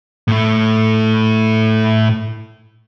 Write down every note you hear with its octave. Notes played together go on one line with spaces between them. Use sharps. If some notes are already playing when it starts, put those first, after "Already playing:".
A2 A3